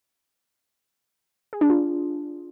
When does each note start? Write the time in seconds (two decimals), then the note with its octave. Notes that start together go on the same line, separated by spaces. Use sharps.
1.53 G#4
1.61 D4
1.70 F4